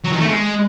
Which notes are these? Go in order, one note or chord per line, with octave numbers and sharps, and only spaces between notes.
F#3
D#3
A3
G#3